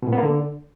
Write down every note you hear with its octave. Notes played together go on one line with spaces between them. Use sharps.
B2
A#2
B3
A#3
D3